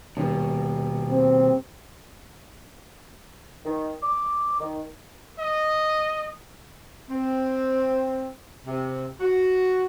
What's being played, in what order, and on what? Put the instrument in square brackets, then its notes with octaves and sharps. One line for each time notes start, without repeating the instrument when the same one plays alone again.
[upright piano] D#1 [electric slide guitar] B2
[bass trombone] C4
[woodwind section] D#3
D6
D#3
[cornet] D#5
[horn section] C4
C3
F#4